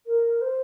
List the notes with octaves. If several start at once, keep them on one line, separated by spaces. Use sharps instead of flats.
A#4
C5